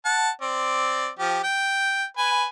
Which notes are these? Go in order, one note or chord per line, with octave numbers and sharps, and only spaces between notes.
F#5 A5
C4 D5
F3 G4
G5
B4 G#5